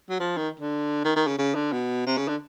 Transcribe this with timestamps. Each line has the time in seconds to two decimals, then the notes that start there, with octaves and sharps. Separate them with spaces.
0.09 F#3
0.20 F3
0.37 D#3
0.60 D3
1.05 D#3
1.16 D#3
1.27 C#3
1.38 C#3
1.55 D3
1.72 B2
2.06 C3
2.17 C#3
2.28 D3